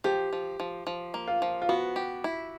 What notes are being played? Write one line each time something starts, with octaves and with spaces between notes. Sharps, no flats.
F3 G4
F3
F3
F3
A#3
F4
F3
F4
B3 F#4
G4
E4